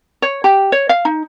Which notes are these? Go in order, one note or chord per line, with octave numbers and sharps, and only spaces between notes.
C#5
G4
C#5
F5
D#4